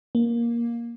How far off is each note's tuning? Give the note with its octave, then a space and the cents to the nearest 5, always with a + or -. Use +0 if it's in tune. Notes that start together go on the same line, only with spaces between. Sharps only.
A#3 +10